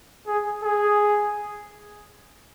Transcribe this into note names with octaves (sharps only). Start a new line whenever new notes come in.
G#4
G#4